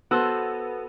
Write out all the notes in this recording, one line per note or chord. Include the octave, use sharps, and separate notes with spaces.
B3 F#4 A4 C5 E6